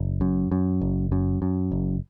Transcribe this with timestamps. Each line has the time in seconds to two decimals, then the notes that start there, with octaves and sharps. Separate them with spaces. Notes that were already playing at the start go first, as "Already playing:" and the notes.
Already playing: F#1
0.21 F#2
0.51 F#2
0.81 F#1
1.12 F#2
1.42 F#2
1.72 F#1